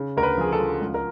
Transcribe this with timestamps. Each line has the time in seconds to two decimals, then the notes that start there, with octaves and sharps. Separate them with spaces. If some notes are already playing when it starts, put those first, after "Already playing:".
Already playing: C#3
0.17 D2 A#4
0.23 B4
0.37 F3 G#4
0.52 A4
0.60 F3
0.81 C#2
0.94 A#4